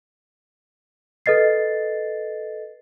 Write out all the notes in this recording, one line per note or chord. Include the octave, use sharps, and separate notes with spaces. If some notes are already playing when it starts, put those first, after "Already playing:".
A4 B4 D#5 A6 C7